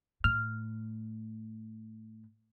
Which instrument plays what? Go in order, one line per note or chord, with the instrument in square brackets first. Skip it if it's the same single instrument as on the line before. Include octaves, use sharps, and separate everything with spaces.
[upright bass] A2 [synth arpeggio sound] F6